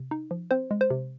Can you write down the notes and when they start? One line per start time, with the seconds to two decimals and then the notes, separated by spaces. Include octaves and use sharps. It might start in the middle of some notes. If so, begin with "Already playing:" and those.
Already playing: C3
0.11 D#4
0.31 F3
0.51 C4 C5
0.71 G#3
0.81 C5
0.91 C3